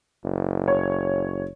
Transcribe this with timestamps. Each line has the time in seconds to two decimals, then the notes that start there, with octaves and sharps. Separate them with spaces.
0.24 F#1
0.68 C#5